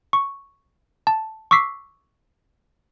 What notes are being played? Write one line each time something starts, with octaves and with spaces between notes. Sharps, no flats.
C#6
A5
C#6 D6 E6 B6 C7